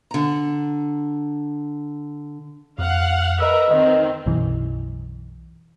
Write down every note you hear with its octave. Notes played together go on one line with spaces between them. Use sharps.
D3 A#5
F2 F5 F#5
A#4 B4 D#5 E5 E6
D#3 C4 D#5
B1 F#2 E3